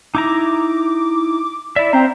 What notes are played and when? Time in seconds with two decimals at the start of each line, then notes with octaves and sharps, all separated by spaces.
0.15 D#4 E4 A#5 D6
1.76 E4 D5 E5
1.93 C4 E5 F5 G5 A#5